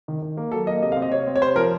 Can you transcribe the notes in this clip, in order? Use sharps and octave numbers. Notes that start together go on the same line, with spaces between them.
D#3
D#3
A#3
F#3 A4
A#3 D#5
C3 D#5
F5
C4
D#5
C3 C#5
C4
C#5
C3 C5
F3 A#4